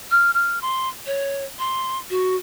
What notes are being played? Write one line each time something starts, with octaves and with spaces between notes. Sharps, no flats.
F6
F6
C6
C#5
C6
F#4